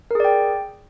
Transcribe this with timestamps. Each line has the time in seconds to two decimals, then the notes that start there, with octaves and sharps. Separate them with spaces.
0.11 A#4
0.15 G#4
0.20 D5
0.25 G5